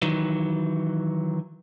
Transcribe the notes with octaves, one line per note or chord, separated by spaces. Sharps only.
D#3 E3 F#3